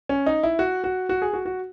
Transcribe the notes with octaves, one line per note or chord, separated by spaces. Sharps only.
C#4
D#4
E4
F#4
F#4
F#4
G#4
F#4
F#4